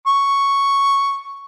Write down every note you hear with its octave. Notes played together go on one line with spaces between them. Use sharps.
C#6